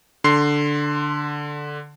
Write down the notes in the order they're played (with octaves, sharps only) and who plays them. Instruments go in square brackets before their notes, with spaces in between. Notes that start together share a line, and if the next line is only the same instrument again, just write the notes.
[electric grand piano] D3 C6 C7